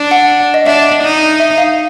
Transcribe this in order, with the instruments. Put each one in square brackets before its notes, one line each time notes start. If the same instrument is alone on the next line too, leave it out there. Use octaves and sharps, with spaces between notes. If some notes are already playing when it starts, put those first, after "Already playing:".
Already playing: [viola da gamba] D4
[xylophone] F#5
D#5
[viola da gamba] D4 [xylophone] E5
[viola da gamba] D#4
[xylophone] E5
F5